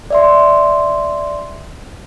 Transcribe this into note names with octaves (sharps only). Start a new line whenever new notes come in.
D5 E5 C6